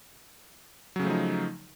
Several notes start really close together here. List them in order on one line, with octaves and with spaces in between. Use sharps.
F#3 C#3 A3 F3 D#4